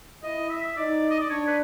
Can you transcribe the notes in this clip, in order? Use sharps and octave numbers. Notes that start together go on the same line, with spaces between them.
E4 D#5
E5
D#4 D5
D#5
D5
D4 C#5
B4